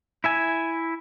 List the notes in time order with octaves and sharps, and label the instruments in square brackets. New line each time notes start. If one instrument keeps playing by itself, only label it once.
[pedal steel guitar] E4 E5 G#5